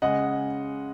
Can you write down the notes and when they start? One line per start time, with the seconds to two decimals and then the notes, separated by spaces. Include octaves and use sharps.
0.02 C#3 G#3 D#5 F#5